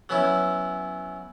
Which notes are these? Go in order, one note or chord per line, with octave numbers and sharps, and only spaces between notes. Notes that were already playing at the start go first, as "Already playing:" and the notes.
F#3 B3 C#4 E4